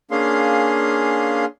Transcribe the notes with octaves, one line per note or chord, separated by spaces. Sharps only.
A#3 C#4 D4 G#4 F5 C6